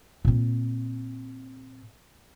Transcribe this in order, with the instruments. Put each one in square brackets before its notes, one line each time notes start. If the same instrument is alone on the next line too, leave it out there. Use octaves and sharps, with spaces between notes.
[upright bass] A#2 C4